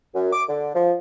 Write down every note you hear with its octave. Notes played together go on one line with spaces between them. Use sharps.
F#2
D6
D3
F3